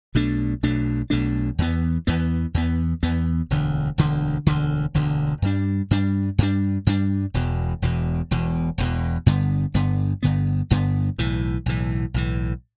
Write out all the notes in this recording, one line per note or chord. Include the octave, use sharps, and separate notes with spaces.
B1 B2 A3 D4
B1 B2 A3 D4
B1 B2 A3 D4
E2 E3 B3
E2 E3 B3
E2 E3 B3
E2 E3 B3
E1 D2 D3
E1 D2 D3
E1 D2 D3
E1 D2 D3
G2 G3 D4
G2 G3 D4
G2 G3 D4
G2 G3 D4
E1 E2 B2
E1 E2 B2
E1 E2 B2
E1 E2 B2
G1 G2 D3 B3
G1 G2 D3 B3
G1 G2 D3 B3
G1 G2 D3 B3
B1 A2 E3
B1 A2 E3
B1 A2 E3